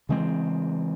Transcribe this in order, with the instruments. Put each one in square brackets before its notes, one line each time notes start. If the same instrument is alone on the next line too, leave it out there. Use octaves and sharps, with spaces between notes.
[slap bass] C#3 E3 G#3 C4